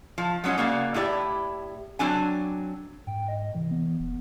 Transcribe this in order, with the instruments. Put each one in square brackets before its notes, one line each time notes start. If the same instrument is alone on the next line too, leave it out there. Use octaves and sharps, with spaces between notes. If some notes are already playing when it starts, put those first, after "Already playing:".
[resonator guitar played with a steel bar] F3
F#3 G#3 C#4 D#4 F#4
C#3 A#3 F#4 D5
A2 E4 G4 D5
F#3 C4 D4 G#5
[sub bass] G#2 [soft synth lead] G5
[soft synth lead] D#5
[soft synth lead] C3 [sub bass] E3
[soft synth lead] B3
[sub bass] E1